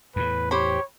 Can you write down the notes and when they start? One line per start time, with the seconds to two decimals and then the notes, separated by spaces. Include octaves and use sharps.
0.16 E2 A2 B4
0.51 G4 C5 C#5 B5